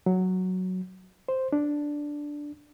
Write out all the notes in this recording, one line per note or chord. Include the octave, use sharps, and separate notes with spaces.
F#3
C5
D4